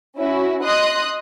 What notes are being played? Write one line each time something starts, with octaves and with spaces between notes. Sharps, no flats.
C#4 E4 F#4
D#5 C6 D#6 F#6